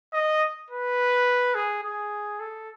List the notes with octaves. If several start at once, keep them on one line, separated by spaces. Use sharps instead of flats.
D#5
B4
G#4
G#4
A4